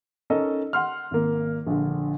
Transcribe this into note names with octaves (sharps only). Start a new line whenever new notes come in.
C#4 D#4 A4 A#4 D#5
F#5 C6 F6
G#1 A#3
A#1 D3